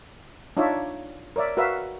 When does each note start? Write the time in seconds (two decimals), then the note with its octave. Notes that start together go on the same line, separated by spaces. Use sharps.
0.57 D4 D#4 F4 C#5 D5 E5
1.36 A#4 C#5 D5 E5
1.57 F#4 A#4 B4 E5 F5